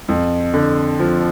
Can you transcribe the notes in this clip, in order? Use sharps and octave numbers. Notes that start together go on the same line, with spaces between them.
F2
D3
F3